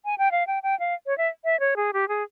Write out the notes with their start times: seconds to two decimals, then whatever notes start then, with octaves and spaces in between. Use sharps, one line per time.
0.05 G#5
0.18 G5
0.32 F5
0.47 G5
0.63 G5
0.80 F5
1.06 C#5
1.18 E5
1.44 E5
1.60 C#5
1.76 G#4
1.93 G4
2.08 G#4